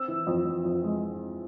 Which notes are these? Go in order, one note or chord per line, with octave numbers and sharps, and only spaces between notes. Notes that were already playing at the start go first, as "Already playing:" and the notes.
Already playing: C4 E6
E3
F2
F2
F2
G#3